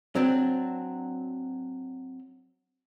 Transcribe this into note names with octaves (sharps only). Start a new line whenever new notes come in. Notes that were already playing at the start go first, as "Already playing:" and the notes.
F#3 C4 D4